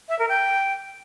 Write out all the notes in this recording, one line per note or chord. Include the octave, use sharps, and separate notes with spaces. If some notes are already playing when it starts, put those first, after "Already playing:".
E5
A#4
G5